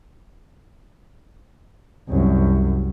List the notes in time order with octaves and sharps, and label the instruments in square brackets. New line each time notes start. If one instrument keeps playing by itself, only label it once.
[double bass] C2 F#2